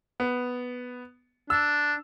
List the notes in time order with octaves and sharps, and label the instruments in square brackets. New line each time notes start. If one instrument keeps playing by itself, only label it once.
[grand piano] B3
[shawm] D4 [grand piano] E6